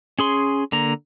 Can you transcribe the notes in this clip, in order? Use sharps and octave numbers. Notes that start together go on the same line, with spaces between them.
C#4 G#4 C6
D3 A#3 A#5